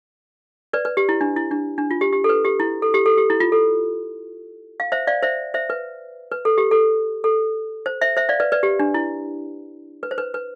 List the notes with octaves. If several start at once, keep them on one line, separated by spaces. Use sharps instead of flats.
B4 D5
B4
G4
E4
D4
E4
D4
D4
F4
G4
G4
A4
B4
G4
E4
A4
G4
A4
G4
E4
F4
A4
F5
C5 E5
D5 F5
C5 E5
C5 E5
B4
B4
A4
G4
A4
A4
C5
C5 E5
C5 E5
D5 F5
B4 D5
B4 D5
G4
D4
E4
B4
C5
B4
B4